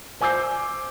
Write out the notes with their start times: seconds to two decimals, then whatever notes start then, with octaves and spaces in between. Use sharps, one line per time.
0.21 C5 G#5 D6 E6 G6 C7